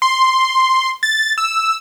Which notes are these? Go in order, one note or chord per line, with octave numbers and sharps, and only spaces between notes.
C6
A6
E6